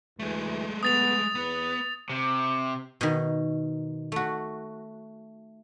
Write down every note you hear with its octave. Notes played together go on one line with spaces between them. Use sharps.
D2 E3 G#3 A3
B3 D#6 A6 F7
E2 B3 B4
C3
B2 D#3
A3 F#4